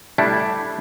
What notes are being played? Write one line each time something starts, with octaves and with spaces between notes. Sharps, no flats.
G3 A3 D4 E4